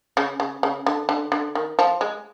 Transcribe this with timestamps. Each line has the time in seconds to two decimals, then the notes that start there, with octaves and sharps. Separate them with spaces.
0.17 C#3
0.40 C#3
0.63 C#3
0.86 D3
1.09 D3
1.32 D3
1.55 D#3
1.79 F3
2.01 G#3